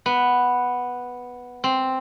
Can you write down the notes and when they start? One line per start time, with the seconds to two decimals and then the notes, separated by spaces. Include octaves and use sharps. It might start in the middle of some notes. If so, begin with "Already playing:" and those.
0.06 B3
1.64 C4